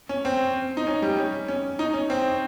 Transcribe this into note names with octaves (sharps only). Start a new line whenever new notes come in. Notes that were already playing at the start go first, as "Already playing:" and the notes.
C#4
C4
D#4
C#4
G3
C#4
C#4
D#4
C#4
C4